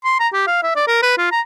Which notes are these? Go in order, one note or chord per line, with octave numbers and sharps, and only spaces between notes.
C6
A#5
G4
F5
E5
D5
A#4
B4
F4
A#5